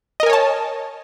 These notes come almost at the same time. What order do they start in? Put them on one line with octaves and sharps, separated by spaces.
D#5 A#4 G#5 C#5 A5